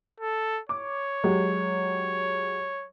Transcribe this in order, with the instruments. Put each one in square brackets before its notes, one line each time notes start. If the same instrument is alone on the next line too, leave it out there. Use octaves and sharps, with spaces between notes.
[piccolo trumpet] A4
[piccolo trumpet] C#5 [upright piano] D6
[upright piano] F#3 G#3 G4